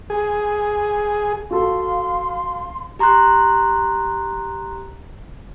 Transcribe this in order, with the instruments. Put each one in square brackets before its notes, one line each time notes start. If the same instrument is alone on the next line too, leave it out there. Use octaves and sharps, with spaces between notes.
[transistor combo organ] G#4
[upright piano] F#4 A4 [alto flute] F5 [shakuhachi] C6
[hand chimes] G4 A#5 C6 C#6 F#6